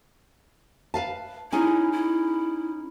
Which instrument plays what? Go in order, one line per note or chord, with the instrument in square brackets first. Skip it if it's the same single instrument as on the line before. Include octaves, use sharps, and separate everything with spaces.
[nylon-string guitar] B4 F5 A5
[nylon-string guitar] C#4 D#4 G#4 [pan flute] E4
[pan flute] E4